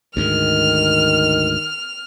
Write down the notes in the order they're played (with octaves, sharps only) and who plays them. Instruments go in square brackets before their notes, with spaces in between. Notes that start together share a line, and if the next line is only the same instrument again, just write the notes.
[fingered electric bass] D2 G#2 G#3 [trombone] D#3 [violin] F6